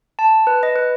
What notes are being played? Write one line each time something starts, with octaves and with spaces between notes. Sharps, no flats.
A5
B4
D#5
B4